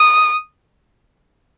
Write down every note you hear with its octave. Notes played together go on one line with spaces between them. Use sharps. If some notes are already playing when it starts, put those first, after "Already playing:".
Already playing: D#6